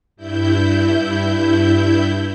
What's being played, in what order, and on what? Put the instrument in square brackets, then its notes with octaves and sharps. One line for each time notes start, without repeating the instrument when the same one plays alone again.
[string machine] G2 E4 G6